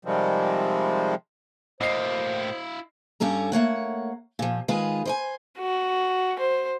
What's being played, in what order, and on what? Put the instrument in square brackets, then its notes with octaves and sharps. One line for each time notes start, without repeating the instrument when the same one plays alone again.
[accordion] C3 D#3 F3 G3 G#3 C4
[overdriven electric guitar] A2 A#3 [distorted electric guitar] E4 F5 [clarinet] C5 [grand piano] D#5 C7
[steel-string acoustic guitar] G2 G3 C#4 A4 A#5
A3 A#3 C#5 F#5
A#2 F3
D#3 G#3 F4 G#4 B4
C5 D5 G#5
[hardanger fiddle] F#4
C5